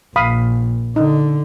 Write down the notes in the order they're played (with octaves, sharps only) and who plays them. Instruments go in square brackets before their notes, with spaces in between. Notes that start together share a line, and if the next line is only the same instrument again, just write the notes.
[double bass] A#1 [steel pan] F5 B5 D#6
[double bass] D3 [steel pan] D#4